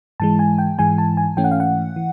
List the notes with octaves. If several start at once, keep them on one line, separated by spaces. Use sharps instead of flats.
G#2 E3 G#3 A5
G#5
G5
G#2 E3 G#3 G#5
A5
G#5
G#2 E3 A3 C#4 G5
F#5
F5
F#5
E3